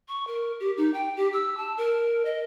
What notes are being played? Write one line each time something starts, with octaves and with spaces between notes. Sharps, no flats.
C#6
A#4
G4
D#4
G5
G4
E6
A5
A#4
D#5